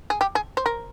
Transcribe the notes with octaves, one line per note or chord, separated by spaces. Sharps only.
G#4
G4
G#4
C5
A#4